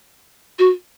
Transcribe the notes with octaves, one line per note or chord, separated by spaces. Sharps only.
F#4